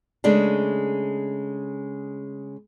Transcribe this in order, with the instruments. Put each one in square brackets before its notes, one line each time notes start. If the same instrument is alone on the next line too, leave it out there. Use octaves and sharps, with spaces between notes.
[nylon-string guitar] C#3 G#3 A3 D4